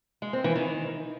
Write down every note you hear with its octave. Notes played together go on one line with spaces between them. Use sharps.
G#3
C4
E3
D#3